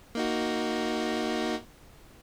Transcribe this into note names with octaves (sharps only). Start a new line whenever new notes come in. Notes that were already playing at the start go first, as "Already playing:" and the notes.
A#3 D#4 F#4